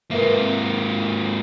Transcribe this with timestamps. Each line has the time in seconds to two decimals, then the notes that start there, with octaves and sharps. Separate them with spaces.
0.11 G#2 A#3 A#4 B4 E5
0.37 C4